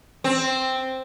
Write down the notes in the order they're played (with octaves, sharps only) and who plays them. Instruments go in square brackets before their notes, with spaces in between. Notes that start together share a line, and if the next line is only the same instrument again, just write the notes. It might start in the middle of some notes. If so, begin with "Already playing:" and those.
[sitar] C4